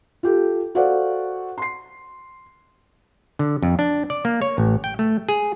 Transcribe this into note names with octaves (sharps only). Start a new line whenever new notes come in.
F4 G4 A4
F#4 A4 C5 D5 F5 F#5
C6 C7
D3
F2
D4
D5
A#3
C#5
A1
G5
A3
G#4